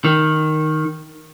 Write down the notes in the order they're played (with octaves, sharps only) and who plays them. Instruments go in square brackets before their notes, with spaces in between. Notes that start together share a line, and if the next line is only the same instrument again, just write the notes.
[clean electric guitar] D#3